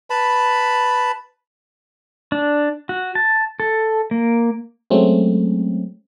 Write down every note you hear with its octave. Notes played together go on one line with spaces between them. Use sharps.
B4 A5 B5
D4
F#4
A5
A4
A#3
F#3 G#3 A3 C4 C#4